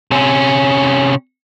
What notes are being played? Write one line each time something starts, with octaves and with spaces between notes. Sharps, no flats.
C3 C#4